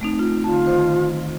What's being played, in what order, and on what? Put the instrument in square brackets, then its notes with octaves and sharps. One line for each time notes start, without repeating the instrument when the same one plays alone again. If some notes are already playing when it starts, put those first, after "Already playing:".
[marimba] A3 C4 D#4
F4
[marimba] D3 A5 [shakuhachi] F4
[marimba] D#3 C5